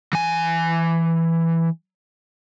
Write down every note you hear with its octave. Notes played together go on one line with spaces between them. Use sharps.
E3 G#5